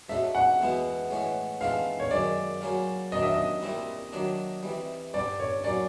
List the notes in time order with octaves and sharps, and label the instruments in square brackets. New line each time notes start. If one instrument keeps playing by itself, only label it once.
[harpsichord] F3 G#3 C#4 F#4 A4 [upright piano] E5
[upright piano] F#5
[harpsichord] E2 B2 G#3 B3 E4
A2 E3 G#3 C#4
[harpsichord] E3 G#3 C4 F4 A4 [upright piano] F5
[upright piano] C#5
[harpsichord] F#2 D#3 G#3 [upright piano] D5
[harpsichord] C#3 F#3 A#3 C#4 F4
[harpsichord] D#3 F#3 A#3 D4 [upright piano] D#5
[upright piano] E5
D#5
[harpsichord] C2 A#2 G3 C4 E4
D#3 F#3 A#3 D4
C3 E3 G3
[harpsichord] G2 D3 G3 [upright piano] D5
[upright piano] C#5
[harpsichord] F#3 A#3 C#4 [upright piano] D5